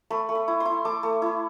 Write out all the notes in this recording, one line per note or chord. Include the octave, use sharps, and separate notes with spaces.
A3 B5
A3
B5
E4
C6
E4
A3 D6
A3
E4